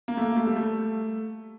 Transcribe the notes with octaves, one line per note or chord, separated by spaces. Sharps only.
A#3
A3
A#3
A3
G3
A3